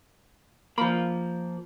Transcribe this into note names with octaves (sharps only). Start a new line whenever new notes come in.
F3 A#3 B5